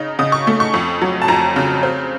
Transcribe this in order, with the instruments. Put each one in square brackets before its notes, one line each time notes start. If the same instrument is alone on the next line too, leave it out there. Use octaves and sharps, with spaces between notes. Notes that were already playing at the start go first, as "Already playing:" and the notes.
Already playing: [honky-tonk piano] C#3 D#4
C#3 D#6
C#6
A3
C#6
F2
F#3
A5
F2 A#5
C#3
C4